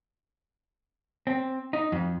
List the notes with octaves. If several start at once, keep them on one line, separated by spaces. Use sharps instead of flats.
C4
D#4
F2